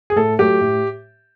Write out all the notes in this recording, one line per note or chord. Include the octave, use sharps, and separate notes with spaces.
G#4
A2 A4
F#3 A3 G4
A2